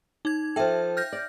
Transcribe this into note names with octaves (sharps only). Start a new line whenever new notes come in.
D#4 G#6
F3 A4 E5 G5
F6 G6 A#6
D5